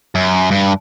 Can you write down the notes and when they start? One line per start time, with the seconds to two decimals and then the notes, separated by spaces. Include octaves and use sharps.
0.15 F#2
0.51 G2